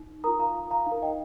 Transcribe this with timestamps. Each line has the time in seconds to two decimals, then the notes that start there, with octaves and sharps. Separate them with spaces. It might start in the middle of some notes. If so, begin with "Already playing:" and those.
Already playing: D#4
0.24 F4 A#4 A#5 D#6
0.39 F5 A#5
0.71 F5 A#5
0.86 D#4 F5
0.91 A#4
1.02 D#5 G5